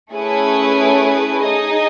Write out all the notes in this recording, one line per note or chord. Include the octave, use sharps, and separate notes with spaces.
A3 C#4 E4 G#4 B4
D#4 G#4 D#5